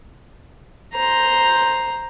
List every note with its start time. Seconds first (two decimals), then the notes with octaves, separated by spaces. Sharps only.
0.94 C5 A#5